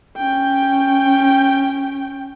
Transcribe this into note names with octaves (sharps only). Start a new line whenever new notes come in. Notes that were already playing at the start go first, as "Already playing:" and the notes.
C#4 G5